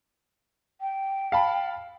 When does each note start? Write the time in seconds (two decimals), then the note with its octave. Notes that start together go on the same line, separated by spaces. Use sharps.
0.81 G5
1.32 F5 A5 B5